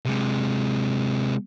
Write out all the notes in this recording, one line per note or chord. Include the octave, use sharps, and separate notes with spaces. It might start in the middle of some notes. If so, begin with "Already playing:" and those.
C3 G#3